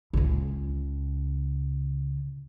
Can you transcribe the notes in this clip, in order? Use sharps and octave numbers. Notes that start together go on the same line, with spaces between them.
C#2 C#3